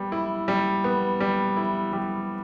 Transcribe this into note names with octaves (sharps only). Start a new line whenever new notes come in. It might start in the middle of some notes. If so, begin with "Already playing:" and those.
Already playing: G3 B3
E4
G3
B3
G3
E4
G3